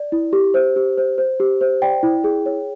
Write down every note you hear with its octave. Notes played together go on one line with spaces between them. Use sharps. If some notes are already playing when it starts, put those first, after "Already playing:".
Already playing: D5
E4
G4
C5
G4
C5
C5
G4
C5
D5 G5
E4
G#4
C#5